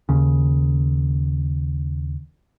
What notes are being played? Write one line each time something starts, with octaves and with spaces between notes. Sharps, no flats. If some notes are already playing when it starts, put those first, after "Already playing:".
D#2 C#3